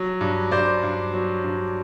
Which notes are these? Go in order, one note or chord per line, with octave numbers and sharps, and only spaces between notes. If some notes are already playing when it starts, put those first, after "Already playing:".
Already playing: F#3
G2
G2 C5 D5
G2
F#3
G2